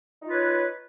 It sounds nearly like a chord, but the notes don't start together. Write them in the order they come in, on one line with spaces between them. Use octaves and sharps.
D#4 F4 B4 C#5